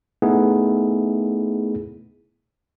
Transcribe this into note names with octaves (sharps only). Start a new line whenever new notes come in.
A3 B3 D#4 E4 G#4